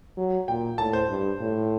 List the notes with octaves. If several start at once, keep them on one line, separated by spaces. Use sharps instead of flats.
F#3
A#2 G5
A2 A5
C5
G2
A2